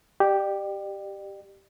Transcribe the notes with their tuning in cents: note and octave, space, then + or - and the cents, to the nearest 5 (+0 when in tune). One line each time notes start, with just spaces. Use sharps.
G4 +0 D5 +35